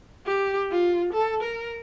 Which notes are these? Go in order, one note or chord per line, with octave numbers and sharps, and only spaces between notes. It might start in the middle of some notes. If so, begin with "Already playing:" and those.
G4
F4
A4
A#4